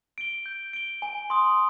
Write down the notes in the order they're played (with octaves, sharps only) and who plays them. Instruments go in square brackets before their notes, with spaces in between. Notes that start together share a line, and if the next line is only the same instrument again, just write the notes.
[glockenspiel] D7 G7
G6
D7 G7
G#5
C6 D#6